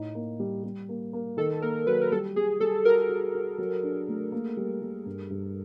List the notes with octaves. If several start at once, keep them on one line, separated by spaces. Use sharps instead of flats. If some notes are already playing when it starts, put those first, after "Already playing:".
Already playing: A2 D#4
A#3
G3
G3
A#3
A#3
D#3 A4
A#3 A#4
F#3 B4
A#4
G3 A4
G3 G#4
G3 A4
F#4 A#4
F#4
F#4
F#3
D4
A3
A#3
G3
G3
G2
G2